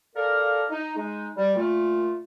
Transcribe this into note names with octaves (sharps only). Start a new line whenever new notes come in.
A4 A#4 D5 F5
D#4
G#3 D#4
G3
A#2 A3 F4